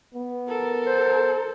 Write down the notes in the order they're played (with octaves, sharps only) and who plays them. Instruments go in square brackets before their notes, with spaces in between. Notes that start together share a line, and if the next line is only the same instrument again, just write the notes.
[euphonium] B3
[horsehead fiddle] A4 A#4
[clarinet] C5